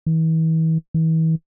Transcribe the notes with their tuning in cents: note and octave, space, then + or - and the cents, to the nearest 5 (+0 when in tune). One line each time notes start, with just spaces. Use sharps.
E3 -40
E3 -40